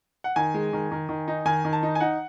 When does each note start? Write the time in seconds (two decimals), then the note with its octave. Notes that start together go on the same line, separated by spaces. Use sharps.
0.24 F#5
0.36 D#3 G#5
0.54 G#3
0.73 D#3
0.92 D#3
1.09 D#3
1.28 D#4
1.45 D#3 G#5
1.65 D#3
1.73 A5
1.83 D#4
1.95 G#5
2.00 D#4 F#5